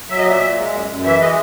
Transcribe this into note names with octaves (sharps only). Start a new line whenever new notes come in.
F#3 E5
D#5
A#2 E5
A#2
G#3
F#2
F#2
E3 E5
G#3 D#5